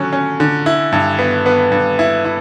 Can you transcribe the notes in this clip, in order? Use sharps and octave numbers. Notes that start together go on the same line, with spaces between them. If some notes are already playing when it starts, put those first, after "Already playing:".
Already playing: D3 F#3 C#4
C#4
D3
E4
G2
B3
B3
G2
E4
E4